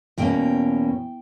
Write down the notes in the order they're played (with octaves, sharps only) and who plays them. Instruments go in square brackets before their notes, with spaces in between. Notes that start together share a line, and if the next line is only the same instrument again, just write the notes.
[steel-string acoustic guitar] E2 B2 A#3 C#4 G5